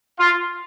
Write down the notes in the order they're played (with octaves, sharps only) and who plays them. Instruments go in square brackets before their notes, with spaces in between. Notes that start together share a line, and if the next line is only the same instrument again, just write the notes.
[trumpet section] F4